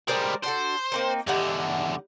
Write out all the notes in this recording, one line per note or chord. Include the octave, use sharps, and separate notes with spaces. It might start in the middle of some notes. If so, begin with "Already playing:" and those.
G3 G#3 A#4 C5 D5
D4 F#4 A4 C5
A#3 C4 D#4
E2 D3 G3 D#4 F#5